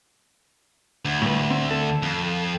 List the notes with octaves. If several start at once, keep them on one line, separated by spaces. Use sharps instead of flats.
D2
A2 G3 B4
C4
A4
F2